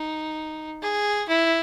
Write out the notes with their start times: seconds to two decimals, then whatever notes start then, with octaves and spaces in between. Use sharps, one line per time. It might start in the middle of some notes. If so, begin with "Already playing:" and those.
Already playing: D#4
0.82 G#4
1.28 E4